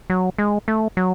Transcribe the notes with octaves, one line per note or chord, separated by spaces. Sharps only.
F#3
G#3
A3
F#3